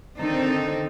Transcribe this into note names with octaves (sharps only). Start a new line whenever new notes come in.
D3 D#3 C4 D#4 A4